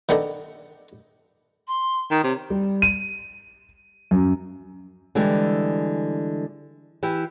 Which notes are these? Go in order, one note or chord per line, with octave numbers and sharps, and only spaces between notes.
D#3 B3 D4 A4 D#5
C6
D#3 D#6
C3 C#5
G3
D#7
F#2
D3 E3 G3 G#3
E3 E4 G4